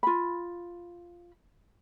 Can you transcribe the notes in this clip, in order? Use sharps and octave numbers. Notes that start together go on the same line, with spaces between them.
F4 B5